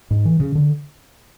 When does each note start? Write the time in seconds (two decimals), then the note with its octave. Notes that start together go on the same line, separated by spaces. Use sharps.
0.11 G#2
0.25 E3
0.40 C#3
0.55 D3